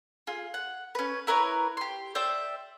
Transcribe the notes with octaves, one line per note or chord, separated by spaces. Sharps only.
F4 G#4
F#5
C#4 B4
E4 A#4 B4 C#5
G4 C6
C5 D5 E5 G5